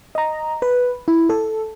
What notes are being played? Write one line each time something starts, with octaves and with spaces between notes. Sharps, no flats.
D#5 A#5
B4
E4
A4